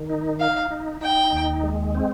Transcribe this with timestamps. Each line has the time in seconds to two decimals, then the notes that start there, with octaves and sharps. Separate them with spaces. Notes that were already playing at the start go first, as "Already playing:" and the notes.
Already playing: D#3
0.10 D#4
0.40 D#4 F5
0.71 D#4
1.01 D#4 G5
1.32 D#2
1.63 G#3
1.95 C4